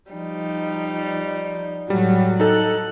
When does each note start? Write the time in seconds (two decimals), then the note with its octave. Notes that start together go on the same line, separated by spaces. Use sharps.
0.11 F3 G3 D#4
1.90 A2 F#3 G3
2.40 D#4 A4 F#6